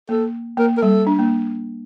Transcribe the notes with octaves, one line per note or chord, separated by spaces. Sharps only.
A#3 A4
A#3 A#4
A#4
G3 A4
D4
A#3